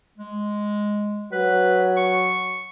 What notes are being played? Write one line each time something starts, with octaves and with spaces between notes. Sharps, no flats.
G#3
F#3 B4
C#6